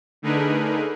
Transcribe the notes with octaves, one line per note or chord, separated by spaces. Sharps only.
D3 A3 D#4 G#4 A#4 B4